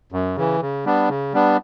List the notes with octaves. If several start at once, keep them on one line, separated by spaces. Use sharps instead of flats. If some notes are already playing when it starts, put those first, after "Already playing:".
F#2
C#3 E3
C#3
G3 B3 D4
C#3
G3 B3 D4